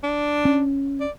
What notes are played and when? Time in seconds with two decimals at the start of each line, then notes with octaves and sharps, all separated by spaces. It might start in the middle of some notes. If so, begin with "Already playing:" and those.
0.03 D4
0.45 C#4
1.01 D5